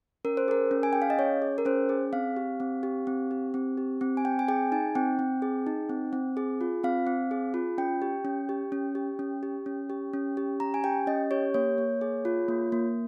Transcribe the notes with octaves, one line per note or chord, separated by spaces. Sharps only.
C#4 A#4
C5
G#4 A#4
C#4
G#5
G#4 G5
F5
D#5
C#4 C#5
G#4
A#4
C#4 C5
G#4
C4 F5
G4
C4
G4
C4
G4
C4
G4
C4
G#5
C4 G5
G#5
G#4 G5
D#4 G#5
C4 G5
C4
G#4
D#4
C4
C4
G#4
F4
C4 F5
C4
G#4
F4
C#4 G5
G4
C#4
G4
C#4
G4
C#4
G4
C#4
G4
C#4
G4
C#4 A#5
G#5
G4 G5
C#4 D#5
G4 C#5
A#3 C#5
A#3
G#4
F4
A#3
A#3